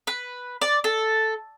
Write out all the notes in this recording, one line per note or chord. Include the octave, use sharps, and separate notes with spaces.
B4
D5
A4